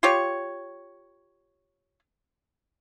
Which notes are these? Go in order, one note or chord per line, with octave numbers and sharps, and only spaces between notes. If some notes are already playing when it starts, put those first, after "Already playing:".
F4 G4 C#5